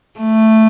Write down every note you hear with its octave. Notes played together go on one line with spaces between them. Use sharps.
A3